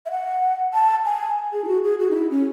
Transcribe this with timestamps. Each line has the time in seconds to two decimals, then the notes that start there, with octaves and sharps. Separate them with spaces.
0.06 E5
0.11 F#5
0.74 A5
1.05 G#5
1.53 G#4
1.64 E4
1.68 F#4
1.84 G#4
2.00 F#4
2.11 D#4
2.15 E4
2.31 C#4